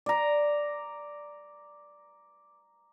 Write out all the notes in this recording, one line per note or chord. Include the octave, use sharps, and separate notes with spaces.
D5 A#5